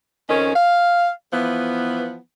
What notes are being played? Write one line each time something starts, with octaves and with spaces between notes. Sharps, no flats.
F2 D#3 C#4
F5
E3 F3 B3